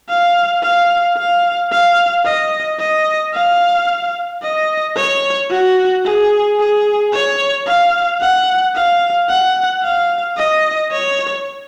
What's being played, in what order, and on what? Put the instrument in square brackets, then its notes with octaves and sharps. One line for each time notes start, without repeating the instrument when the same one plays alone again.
[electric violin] F5
F5
F5
F5
D#5
D#5
F5
D#5
C#5
F#4
G#4
G#4
C#5
F5
F#5
F5
F#5
F5
D#5
C#5